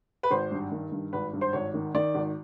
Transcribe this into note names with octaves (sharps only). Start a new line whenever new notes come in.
B4
G#1 C5
G2
D#3
G2
G#1 B4
G2
C5
G#1 C#5
D#3
D#3 D5
G#1